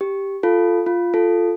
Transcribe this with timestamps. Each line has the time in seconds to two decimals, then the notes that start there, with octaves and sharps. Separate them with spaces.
0.01 G4
0.43 F4 A4
0.86 F4
1.14 F4 A4